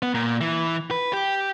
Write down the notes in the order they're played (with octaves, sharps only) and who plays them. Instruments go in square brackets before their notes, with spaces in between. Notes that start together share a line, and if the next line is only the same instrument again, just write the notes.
[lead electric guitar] B3
A#2
E3
B4
G4